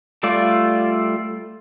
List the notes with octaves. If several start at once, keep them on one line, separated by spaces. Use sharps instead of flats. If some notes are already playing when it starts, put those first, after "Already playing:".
G3 A3 F4 D5